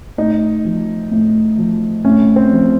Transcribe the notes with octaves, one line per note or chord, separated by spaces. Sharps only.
A2 D#4
F3
A2
F3
A2 C#4
C4
F3